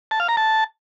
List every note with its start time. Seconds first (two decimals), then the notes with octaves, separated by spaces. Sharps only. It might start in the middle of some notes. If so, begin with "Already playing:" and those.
0.11 A5
0.20 F5
0.28 A#5
0.37 A5